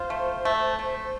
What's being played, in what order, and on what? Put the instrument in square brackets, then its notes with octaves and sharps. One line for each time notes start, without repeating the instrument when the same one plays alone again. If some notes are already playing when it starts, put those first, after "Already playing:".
Already playing: [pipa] F4 [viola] C5
[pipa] A3
A3
A3